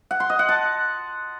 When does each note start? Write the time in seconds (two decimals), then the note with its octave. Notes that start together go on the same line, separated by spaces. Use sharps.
0.11 F#5
0.20 C6
0.30 D#5
0.39 F#5
0.49 A5